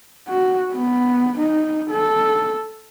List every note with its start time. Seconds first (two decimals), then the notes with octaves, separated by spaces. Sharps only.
0.28 F#4
0.72 B3
1.39 D#4
1.91 A4